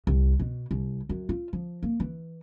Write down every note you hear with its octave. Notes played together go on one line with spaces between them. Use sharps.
C2
B2
C2
F#2
F4
F3
A#3
E3